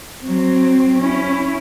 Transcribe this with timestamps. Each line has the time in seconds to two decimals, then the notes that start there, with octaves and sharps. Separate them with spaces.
0.23 F#3 C4
0.98 C#4 E4